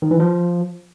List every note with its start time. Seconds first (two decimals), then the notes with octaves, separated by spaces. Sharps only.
0.02 D#3
0.11 E3
0.20 F3